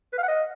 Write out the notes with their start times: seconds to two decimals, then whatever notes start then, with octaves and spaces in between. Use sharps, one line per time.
0.13 B4
0.18 F5
0.23 F#5
0.28 D#5